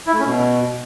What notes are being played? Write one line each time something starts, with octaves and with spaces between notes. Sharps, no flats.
E4
A3
C#4
B2